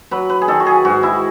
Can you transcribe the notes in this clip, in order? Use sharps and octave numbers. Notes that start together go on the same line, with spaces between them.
F#3 B4
B4
G#4
D#3 A4
F#4
G#4
G#2 F#4
E4